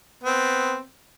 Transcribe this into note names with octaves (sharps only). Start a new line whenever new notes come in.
B3 C4